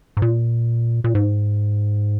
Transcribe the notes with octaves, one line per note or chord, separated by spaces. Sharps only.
G#2
A#2
A#2
G#2